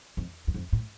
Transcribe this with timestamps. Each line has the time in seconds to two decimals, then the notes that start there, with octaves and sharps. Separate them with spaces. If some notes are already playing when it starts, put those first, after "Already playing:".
0.17 F2
0.47 E2
0.54 F2
0.73 A2